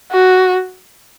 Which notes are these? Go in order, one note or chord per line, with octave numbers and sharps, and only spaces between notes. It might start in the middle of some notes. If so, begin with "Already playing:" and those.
F#4